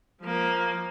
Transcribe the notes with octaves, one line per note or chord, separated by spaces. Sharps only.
F3 A#3